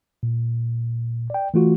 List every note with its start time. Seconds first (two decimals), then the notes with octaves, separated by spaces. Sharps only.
0.23 A#2
1.30 D5 G5
1.54 E3 A3 F4 F#4